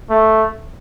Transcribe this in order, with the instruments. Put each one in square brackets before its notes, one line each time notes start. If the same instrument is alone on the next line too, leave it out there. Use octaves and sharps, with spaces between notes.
[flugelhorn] A3